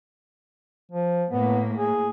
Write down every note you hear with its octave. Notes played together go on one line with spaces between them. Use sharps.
F3
A2 A#3 B3
G#4